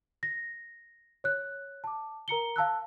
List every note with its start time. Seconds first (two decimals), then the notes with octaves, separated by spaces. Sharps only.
0.23 A#6
1.24 C#5 F#6
1.84 A5 D6
2.28 A#4 A#5 C#7 G7
2.56 F5 A5 E6 F#6